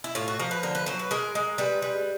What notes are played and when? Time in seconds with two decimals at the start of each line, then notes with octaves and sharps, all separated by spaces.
0.04 E4
0.15 A2 F4
0.28 F#4
0.39 F3 A#4
0.51 B4
0.63 D3 A#4
0.75 B4
0.86 F#3 C5
0.99 B4
1.11 G#3 A#4
1.35 G#3
1.58 G3 B4
1.82 G3